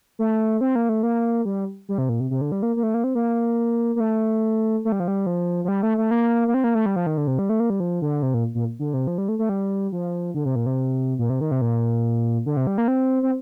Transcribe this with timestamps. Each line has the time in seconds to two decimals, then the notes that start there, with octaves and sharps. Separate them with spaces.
0.19 A3
0.61 C4
0.75 A#3
0.89 A3
1.03 A#3
1.45 G3
1.89 G3
1.98 C3
2.09 A#2
2.20 C3
2.31 C3
2.41 D3
2.52 G3
2.63 A#3
2.76 A#3
2.83 A3
2.94 A#3
3.04 C4
3.15 A#3
3.96 A#3
4.00 A3
4.85 A3
4.92 G3
5.00 F3
5.08 G3
5.26 F3
5.65 F3
5.68 G3
5.83 A3
5.98 A3
6.11 A#3
6.48 A#3
6.54 C4
6.64 A#3
6.75 A3
6.86 G3
6.96 F3
7.06 D#3
7.17 D3
7.27 C3
7.39 G3
7.49 A3
7.60 A#3
7.70 G3
7.80 F3
8.02 D3
8.22 C3
8.34 A#2
8.55 A#2
8.79 D3
8.94 C3
9.07 F3
9.18 G3
9.29 A3
9.39 A3
9.49 G3
9.92 F3
10.34 D3
10.45 C3
10.56 A#2
10.66 C3
11.19 A#2
11.30 C3
11.41 D#3
11.51 C3
11.62 A#2
12.46 D3
12.57 C3
12.67 G3
12.78 A#3
12.88 C4
13.23 C4